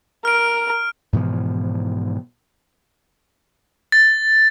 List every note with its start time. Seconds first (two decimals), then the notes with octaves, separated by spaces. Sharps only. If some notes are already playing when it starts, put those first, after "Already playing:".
0.25 A#4 F6 D7
1.13 G#2 B2 E3 F3
3.92 A6